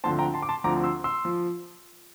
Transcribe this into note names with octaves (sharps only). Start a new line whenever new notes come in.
D2 D3 F3 C4 A5 C6
G5 A#5
A5 C6
D6
A5 C6
D2 D3 F3 C4 A#5 D6
C6 E6
C6 E6
F3